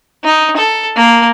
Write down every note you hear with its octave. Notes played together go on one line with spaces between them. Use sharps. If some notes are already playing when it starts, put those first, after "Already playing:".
D#4
A4
A#3